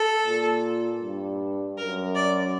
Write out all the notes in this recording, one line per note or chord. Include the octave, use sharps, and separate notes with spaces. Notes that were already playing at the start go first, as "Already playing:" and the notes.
Already playing: A4
A#2
G2
F#2 A#4
D5